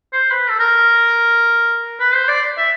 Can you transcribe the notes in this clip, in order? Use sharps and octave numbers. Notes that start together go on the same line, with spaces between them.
C5
B4
A4
A#4
B4
C5
D5
E5